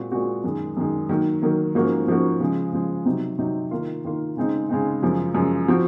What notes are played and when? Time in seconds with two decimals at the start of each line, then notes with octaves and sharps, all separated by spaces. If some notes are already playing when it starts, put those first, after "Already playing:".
Already playing: A#2 G#3 C4 F#4
0.12 A#2 G#3 C4 F#4
0.44 F#2 D#3 G#3
0.77 F#2 D#3 G#3
1.09 D#3 F#3 A#3
1.42 D#3 F#3 A#3
1.75 G#2 F3 A#3 C#4 F#4
2.07 G#2 F3 A#3 C#4 F#4
2.40 C#3 F3 G#3
2.73 C#3 F3 G#3
3.05 C3 F#3 C4 D#4
3.38 C3 F#3 C4 D#4
3.71 D#3 A#3 F4
4.04 D#3 A#3 F4
4.37 C#3 G#3 C4 D#4
4.69 C#3 G#3 C4 D#4
5.02 F#2 C#3 F3 G#3
5.35 F#2 C#3 F3 G#3
5.68 F3 C4 F#4